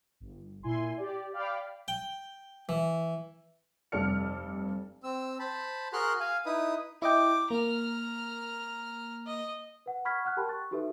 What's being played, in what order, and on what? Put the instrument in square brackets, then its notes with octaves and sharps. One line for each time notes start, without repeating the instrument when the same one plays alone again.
[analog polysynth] G1
A#2 E4 G#5 C6
G4 D5
D5 F5 G5 B5 D6 F6
[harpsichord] G5
E3
[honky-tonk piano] F1 G2 A4 D5 F6 C#7
[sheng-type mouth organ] C4 E6
C5 A5 B5
F#4 G#4 A#4 C6 F6 F#6
F5 G#5
D#4 E4 B4 D#6
[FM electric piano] E4 D#5 G5 [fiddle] D6
[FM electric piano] A#3 [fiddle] A#5 F6
[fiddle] D#5
[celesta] B4 F#5
F#5 B5 C#6 F6 G#6 B6
F#5 F6 F#6
G4 A#4 G5 A5 B5 C6
C#6 F#6 A6
D#4 F#4 G4 A4 B4 E5